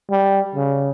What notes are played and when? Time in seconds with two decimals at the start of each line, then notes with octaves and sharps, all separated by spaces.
0.11 G3
0.55 C#3